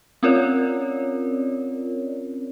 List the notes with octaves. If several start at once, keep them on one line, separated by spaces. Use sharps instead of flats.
C4 C#4 F4 A#4 C#5 D5